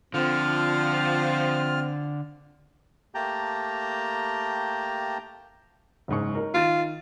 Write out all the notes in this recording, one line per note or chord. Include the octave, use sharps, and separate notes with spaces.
D3 F3 C4 F4 F6
A3 A#3 G4 G5 A5 A#5
F#1 G#2 C#6
D#4 A#4
D#3 F4 A6 D#7